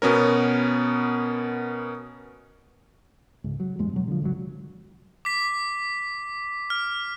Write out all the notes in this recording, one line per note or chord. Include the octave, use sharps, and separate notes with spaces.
B2 B3 C#4 A#4
C#2 G#2
F#3
A1 E2 G2 G#3
B2 F#3
D3 F3
G#1 C#2 C#3 F#3
D6 B6
F6